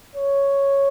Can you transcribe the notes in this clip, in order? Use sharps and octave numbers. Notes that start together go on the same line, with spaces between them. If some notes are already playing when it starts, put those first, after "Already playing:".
C#5